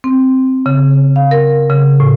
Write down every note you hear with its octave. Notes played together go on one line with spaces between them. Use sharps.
C4
C#3
F5
A#4
C#3
A2